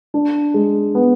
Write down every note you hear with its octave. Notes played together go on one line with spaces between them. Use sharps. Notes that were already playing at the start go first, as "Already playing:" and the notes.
D4
G#3
B3